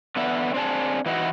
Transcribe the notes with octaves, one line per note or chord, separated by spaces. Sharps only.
D3 B3 E5
C4 D4 G#4 A5
E3 D#4 E4 F#4